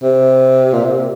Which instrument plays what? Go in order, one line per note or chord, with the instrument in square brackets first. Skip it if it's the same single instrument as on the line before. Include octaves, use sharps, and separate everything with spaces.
[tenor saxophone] C3
A#2
C3